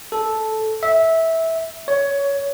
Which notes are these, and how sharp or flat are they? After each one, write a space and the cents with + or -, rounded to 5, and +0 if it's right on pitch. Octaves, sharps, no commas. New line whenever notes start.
A4 -10
E5 -15
C#5 +15